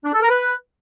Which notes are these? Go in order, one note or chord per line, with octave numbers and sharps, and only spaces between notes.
D4
A4
A#4
B4